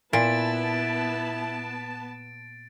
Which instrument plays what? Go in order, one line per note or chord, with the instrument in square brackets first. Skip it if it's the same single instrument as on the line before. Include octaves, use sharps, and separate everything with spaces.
[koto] A#2 [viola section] B3 A5 [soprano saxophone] E4 [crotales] A6 D7